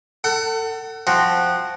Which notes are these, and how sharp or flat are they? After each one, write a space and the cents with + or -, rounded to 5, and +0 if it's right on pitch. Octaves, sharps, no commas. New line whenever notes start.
A4 +30 F#5 +30
F3 +0 C4 +0 F#4 +0